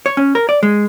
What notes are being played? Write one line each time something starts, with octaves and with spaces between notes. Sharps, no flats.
C#5
C#4
A#4
D5
G#3